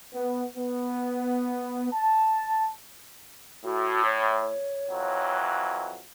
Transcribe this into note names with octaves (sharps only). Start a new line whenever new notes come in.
B3
B3
A5
A2 F#4
C#5
F2 E3 F#3